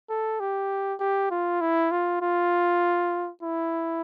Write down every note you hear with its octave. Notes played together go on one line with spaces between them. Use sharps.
A4
G4
G4
F4
E4
F4
F4
E4